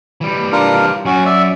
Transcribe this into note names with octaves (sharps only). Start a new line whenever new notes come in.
E3 G3
D4 F4 A#4
F#2 C#4 F#4
D5 E5